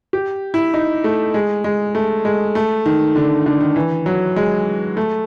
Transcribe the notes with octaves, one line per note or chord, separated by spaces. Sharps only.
G4
E4
D#4
A3
G#3
G#3
A3
G#3
A3
D#3
D3
D3
D#3
E3
F#3
G#3
A3